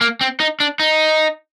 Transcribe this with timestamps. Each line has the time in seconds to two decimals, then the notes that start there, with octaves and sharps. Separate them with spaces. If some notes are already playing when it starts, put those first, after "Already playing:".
0.01 A#3
0.21 C4
0.40 D#4
0.60 D4
0.80 D#4